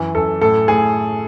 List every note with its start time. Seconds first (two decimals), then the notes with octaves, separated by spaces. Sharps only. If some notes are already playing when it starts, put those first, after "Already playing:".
Already playing: F#2 E3
0.15 F#2 A4
0.42 A2 A4
0.68 A2 G#4